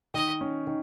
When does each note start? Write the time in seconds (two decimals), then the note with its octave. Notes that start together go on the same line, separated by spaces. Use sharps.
0.14 D#3 D#5
0.41 C#4
0.67 D#3